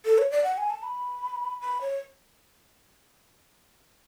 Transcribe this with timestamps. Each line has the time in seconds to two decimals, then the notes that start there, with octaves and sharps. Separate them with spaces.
0.05 A4
0.18 C#5
0.31 D5
0.44 F#5
0.57 G#5
0.70 A5
0.83 B5
1.61 B5
1.81 C#5